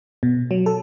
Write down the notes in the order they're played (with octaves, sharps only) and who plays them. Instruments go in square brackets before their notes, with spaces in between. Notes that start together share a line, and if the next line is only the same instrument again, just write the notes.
[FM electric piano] B2
F#3
A4